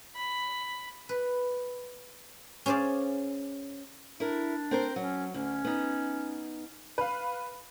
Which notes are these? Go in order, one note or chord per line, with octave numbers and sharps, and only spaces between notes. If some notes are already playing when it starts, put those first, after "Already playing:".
B5
B4
C#4 G#4 C5 D5 F5
D4 E4 A#4
C4 A#4 C5
F#3 C#4
D2 C#4
B3 D#4
B4 F5